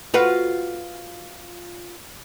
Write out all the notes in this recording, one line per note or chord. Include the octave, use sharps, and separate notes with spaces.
F4 F#4 B4